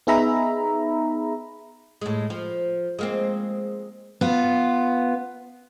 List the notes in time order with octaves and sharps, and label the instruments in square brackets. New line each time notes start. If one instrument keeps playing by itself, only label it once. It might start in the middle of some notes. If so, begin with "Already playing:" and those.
[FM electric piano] B3 D#4 G#4 E5 A#5 B5
[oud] A2 G#3
F3
G#3 A#3 C4
[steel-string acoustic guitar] B3 F4